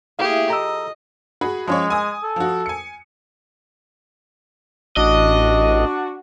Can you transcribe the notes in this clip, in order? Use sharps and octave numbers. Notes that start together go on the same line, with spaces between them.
A3 A#3 E4 G4 G#4 F5
F3 A4 D#5 A#5 E6
F#4 G#4 B5
F3 G#3 C#4 C#5
G#5 D#6
A4
F3 F#4
G#5 C#7
A1 D4 F#4 D#5